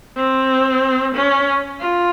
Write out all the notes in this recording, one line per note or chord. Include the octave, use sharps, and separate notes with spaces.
C4
C#4
F4